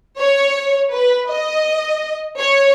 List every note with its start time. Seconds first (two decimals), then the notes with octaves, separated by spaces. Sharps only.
0.19 C#5
0.90 B4
1.29 D#5
2.39 C#5